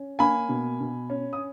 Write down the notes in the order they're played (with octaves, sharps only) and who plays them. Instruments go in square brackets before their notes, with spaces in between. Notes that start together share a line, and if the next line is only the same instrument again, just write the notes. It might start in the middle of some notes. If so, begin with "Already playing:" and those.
Already playing: [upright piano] C#4
A#3 G#5 B5
B2
B2
C#4
D#6